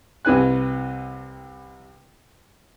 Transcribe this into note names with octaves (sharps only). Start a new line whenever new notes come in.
C2 C3 E4 B4 G#5 F#6